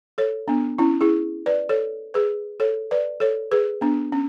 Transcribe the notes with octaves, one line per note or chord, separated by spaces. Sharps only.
A4 C#5
B3 D4
C#4 E4
E4 G#4
B4 D5
A4 C#5
G#4 B4
A4 C#5
B4 D5
A4 C#5
G#4 B4
B3 D4
C#4